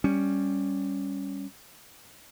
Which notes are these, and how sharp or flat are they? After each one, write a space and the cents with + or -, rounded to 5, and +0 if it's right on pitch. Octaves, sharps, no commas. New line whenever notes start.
G3 +5 C#4 +0